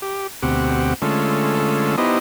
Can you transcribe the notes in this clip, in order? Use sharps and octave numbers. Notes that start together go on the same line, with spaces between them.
G4
D2 B2 C4 G4 F#5
D3 G#3 A3 C#4 F4 A4
B3 D#4 E4 G4 C5 D#5